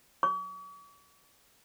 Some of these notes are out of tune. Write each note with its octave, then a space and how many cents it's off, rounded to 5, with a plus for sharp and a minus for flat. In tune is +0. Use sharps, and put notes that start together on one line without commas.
C#6 +45